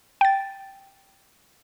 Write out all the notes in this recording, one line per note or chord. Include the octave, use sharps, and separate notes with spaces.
G5 A6